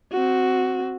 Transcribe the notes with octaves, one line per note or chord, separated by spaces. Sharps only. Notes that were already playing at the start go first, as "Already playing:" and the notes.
C4 F#4